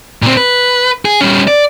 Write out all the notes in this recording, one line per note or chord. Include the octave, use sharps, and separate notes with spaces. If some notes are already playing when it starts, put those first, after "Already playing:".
A#2 C4
B4
G#4
G3 C#4
D5